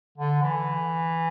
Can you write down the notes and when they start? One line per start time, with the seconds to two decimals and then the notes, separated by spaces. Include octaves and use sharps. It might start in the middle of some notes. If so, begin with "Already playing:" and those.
0.18 D3
0.42 E3